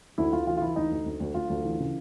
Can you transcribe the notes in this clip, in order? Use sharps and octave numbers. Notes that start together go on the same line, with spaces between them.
D2 E4
D2 F4
E3 F4
F4
E3 E4
D2 D#4
D2
D2
D2
D2 F4
D2
E3
C#3